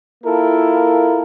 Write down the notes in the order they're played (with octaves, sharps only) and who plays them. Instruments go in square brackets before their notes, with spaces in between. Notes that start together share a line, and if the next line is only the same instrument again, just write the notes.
[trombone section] A#3 E4 F4 A4 A#4